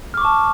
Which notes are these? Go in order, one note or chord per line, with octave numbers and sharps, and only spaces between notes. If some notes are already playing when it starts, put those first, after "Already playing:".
A5 C#6 D6 F6